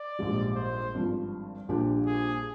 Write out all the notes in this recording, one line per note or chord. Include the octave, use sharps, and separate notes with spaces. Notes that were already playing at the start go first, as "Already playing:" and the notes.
Already playing: D5
A#1 G#2 G3
C5
G#1 G2 F3
A#1 A#2 G3 D4 G4
G#4